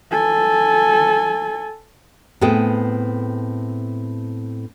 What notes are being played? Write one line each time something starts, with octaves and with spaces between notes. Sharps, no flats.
A4 G#5
A2 B3 C4 G#4 A4 G5